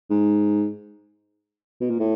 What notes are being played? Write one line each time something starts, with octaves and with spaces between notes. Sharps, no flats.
G#2
B2
A#2
A2